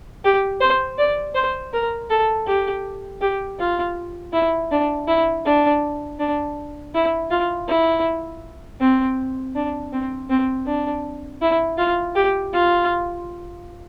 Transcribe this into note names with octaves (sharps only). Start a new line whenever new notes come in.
G4
C5
D5
C5
A#4
A4
G4
G4
F4
E4
D4
E4
D4
D4
E4
F4
E4
C4
D4
C4
C4
D4
E4
F4
G4
F4